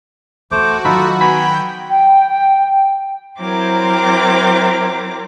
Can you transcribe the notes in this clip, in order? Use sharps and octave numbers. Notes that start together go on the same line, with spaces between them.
E2 A3 D#4 F#4 C5 D6
D#3 F#3 D#4 F4 A4 B5
B3 G5 G#5 B5
G5
F#3 C4 E4 A#4 C5 D6